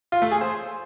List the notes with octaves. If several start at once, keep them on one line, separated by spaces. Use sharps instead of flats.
F4
A3
G#4
C5